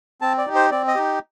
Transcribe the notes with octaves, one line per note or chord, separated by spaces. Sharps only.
C4 A5
D5
D#4 G4
C5
C4 D5
D#5
D#4 G4